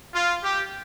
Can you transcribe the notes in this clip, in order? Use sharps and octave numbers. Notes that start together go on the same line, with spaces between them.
F4
G4